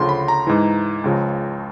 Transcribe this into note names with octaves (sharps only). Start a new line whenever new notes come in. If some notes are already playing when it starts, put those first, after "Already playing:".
Already playing: D2 C#3 F3 C6
B5
A#5
G#2 E3
C#2 C#3 F3